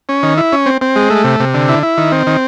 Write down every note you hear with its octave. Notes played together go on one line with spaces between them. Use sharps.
C#4
D#3
E4
C#4
C4
C4
G#3
A3
C3
C3
D3
E4
E4
D#3
C4
D#3